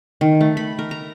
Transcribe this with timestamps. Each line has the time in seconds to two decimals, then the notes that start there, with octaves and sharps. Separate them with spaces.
0.21 D#3
0.41 A3
0.57 B5
0.79 A#4
0.91 A#5